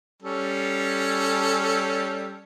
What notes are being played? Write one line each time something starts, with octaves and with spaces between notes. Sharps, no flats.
G3 C#4 A4